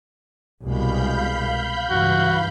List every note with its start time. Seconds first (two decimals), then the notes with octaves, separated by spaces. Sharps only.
0.65 C2 B2 G#3 F5 B5 G6
1.90 C#2 G2 E3 F#4